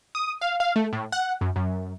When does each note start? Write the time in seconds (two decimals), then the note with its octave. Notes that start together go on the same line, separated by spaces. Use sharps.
0.15 D#6
0.41 F5
0.60 F5
0.76 A3
0.93 A2
1.12 F#5
1.41 F#2
1.56 F#2